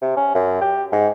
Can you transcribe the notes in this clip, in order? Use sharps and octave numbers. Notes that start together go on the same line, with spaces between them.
C3
C#4
F#2
G4
G#2